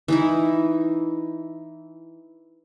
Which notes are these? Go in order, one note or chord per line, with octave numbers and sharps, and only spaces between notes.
E3 D#4 E4